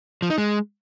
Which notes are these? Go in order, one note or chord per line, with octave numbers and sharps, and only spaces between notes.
F3
D#4
G#3